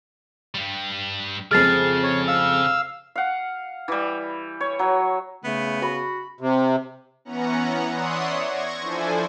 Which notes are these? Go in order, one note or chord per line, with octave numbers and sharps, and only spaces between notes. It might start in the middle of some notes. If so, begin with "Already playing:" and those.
G2 G3
F2 C#3 G#3 F6 A6 C7
C#5
F5 E6
F5 F#5
E3 G3
C#5
F#3
C#3 A3 B3
F#4 B5
C3
E3 B3 C#4 F#5 A#5
C#5 D5 E5 F#5 C6 D#6
C#6 G#6 A#6
F3 D4 E4 A4 C5 G#5